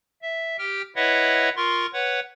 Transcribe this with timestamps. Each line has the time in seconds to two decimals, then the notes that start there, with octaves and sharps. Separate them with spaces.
0.22 E5
0.58 G4 G5 F6
0.96 E4 B4 C#5 D#5 E5 F#5
1.56 F4 A#4 C6 C#6
1.93 B4 C#5 F#5